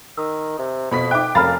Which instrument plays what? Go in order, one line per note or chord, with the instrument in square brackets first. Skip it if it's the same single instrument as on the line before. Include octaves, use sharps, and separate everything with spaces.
[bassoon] D#3 [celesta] E6
[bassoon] C3
[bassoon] F2 [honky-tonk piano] B2 B5 B6
[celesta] D#4 E5 F#6 [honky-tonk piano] G5 D6
[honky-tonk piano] F1 F5 A6 [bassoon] F#2 [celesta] A#5 B5 F6